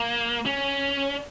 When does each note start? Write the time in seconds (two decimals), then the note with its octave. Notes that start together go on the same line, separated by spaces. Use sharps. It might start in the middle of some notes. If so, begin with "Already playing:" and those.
Already playing: A#3
0.46 C#4